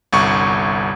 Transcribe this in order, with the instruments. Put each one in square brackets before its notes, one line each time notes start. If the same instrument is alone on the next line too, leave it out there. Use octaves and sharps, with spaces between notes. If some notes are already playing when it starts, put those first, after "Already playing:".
[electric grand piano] G1 C2 C#6